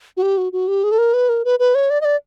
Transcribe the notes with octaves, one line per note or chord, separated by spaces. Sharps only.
F#4
G4
F#4
F#4
G4
G#4
A4
A#4
B4
A#4
B4
B4
C#5
D5
D#5
D5